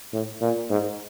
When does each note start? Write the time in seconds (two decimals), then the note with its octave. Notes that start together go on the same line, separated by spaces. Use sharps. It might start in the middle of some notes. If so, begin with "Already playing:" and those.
0.13 A2
0.42 A#2
0.70 G#2